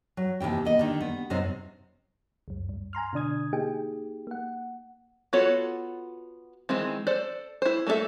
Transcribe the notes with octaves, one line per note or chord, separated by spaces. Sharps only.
F#3
D#2 C3 E3 G5
A#3 B3 D#5
D3 D#3
B3
F#2 C3 B3 C4 D#4 C5
C#2 F#2
G2
G#5 A#5 C6 F6
B2 D3 D4 D#6 G#6
A#3 D#4 G4 G#4 G5
A#3 F#5
B3 F4 F#4 A4 C#5
D#3 E3 G#3 C4
A4 C5 D5
E4 C5
A3 A#3 D4 A4 E5